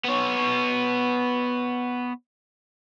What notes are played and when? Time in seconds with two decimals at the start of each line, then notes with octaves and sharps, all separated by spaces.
0.05 B3 C#5